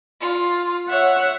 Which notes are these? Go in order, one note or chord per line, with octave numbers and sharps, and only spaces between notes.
F4
C#5 E5 F#5